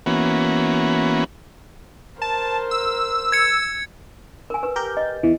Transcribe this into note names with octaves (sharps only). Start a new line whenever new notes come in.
E3 A#3 B3 C#4 F#4
A#4 C5 A5
E6
G#6 C#7
A#4 G#5
B4
G4 A#4 G6
D#5
E2 E3